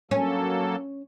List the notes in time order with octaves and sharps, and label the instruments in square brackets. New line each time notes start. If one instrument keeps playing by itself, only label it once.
[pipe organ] F#3 A#3 A4 [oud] C#4